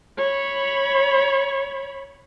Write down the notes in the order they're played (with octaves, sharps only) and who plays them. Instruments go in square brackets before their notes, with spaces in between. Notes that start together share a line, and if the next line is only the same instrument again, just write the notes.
[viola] C#5 B5